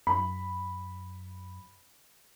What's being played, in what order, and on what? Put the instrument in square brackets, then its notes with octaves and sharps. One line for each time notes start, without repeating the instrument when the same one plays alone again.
[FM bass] F#2 [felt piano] B5